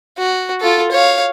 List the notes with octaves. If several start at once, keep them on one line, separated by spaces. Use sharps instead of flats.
F#4
F4 A4
C#5 F5